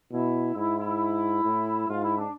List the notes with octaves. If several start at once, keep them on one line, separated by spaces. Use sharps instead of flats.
B2 E4
G#2 E4
E4
A2
G#2 F4
E4
D4